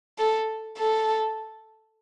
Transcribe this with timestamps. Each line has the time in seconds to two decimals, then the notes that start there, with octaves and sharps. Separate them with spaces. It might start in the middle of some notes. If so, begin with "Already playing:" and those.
0.18 A4
0.78 A4